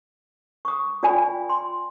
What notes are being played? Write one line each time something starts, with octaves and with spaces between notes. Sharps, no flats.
C#6 D#6
F4 D5 G5 G#5 B5
C6